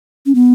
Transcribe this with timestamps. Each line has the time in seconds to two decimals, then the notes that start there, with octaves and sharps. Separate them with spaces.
0.26 C#4
0.35 B3